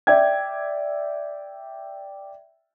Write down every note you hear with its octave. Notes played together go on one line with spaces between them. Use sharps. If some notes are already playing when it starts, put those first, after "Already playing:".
D5 E5 G5 G#6